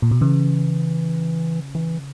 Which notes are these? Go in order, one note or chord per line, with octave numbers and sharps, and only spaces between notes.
A#2
B2
C#3 E3
E3